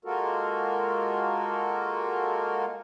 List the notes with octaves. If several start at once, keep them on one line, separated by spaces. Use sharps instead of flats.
G#3 A#3 F4 F#4 A4 A#4